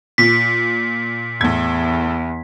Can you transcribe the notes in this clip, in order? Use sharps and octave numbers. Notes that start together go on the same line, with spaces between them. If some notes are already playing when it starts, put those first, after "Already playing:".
A#2 B6
E2 A2 G#6